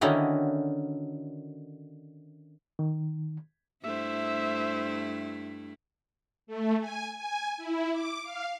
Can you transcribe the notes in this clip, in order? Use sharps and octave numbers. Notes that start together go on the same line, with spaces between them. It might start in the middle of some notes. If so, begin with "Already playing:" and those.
D3 D#3 C#4 D#4 E4 F#4
D#3
G2 A3 E4 C5 E5
A3
G#5
G#5
E4
D6
F5